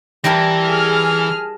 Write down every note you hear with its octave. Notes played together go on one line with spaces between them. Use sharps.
E3 G3 E4 A#4 A5 A#6
G#4 F6